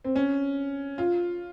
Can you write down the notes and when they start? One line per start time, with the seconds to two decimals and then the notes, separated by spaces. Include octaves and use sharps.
0.05 C4
0.16 C#4
0.98 F4